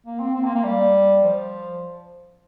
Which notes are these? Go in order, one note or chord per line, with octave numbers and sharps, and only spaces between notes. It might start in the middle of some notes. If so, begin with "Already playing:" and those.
A#3
C4
C4
A#3
A#3
G3
F3